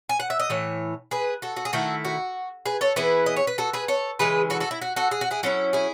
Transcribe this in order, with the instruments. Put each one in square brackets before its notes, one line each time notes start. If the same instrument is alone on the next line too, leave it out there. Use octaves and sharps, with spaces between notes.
[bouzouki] G#5
F#5
E5
D#5
A2 E3 C#5
G#4 B4
F#4 A4
F#4
G#4
D#3 A3 E4 F#4 A4
F#4
G#4 B4
A4 C#5
E3 B3 E4 G#4 B4
D#5
C#5
B4
F#4 A4
G#4 B4
A4 C#5
C#3 E3 G#3 G#4 B4
F#4 A4
F#4 A4
E4
F#4
F#4 A4
G#4
F#4
E4 G#4
F#3 C#4 E4 F#4 A4
E4 G#4